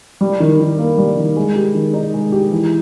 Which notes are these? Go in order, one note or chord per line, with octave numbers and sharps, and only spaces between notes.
G3
D#3
D#3
A#3
G3
D#3
G#3
G4
D#3
D#4
G#3
G4
E3